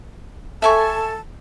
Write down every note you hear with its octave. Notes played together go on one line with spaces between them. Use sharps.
A4 E5 G#5 A5 C#6